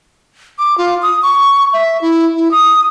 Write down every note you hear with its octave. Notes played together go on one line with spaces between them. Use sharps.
D6
F4
D#6
C#6
E5
E4
E4
D#6